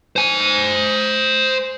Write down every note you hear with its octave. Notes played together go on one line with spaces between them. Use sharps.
C5 G#5